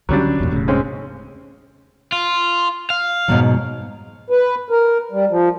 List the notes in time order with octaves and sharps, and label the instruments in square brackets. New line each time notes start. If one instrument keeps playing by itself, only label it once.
[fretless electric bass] C#2 D3 C#4 [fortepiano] F#3 G3 D4
[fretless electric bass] G1 E2 A#2
E1 A2 C#3
[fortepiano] G#3 C4 C#4
[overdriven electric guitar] F4
F5
[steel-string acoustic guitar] G#2 B2 F#3
[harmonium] B4
A#4
G3
F3